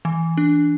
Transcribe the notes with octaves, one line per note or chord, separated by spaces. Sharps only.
E3
D4